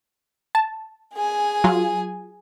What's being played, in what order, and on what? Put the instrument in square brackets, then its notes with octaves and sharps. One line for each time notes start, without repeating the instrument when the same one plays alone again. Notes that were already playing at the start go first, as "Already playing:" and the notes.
[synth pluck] A5
[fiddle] G#4 G#5
[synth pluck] F#3 F4